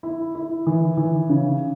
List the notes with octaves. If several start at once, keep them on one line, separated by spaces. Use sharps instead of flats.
E4
E4
E3
E3
C#3